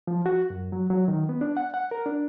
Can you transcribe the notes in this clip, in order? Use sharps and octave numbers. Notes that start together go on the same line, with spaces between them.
F3
F#4
F#2
F#3
F#3
D#3
B3
D4
F#5
F#5
A#4
D4